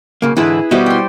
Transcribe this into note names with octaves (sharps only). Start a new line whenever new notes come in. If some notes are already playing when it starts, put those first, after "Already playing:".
B1 C#3 A#3
G#2 D3 E3 E4 G#4 B4
B2 G3 E4 F#4 C5 D#5
G5 C6